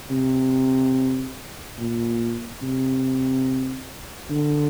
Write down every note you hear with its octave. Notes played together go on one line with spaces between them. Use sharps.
C3
A#2
C3
D3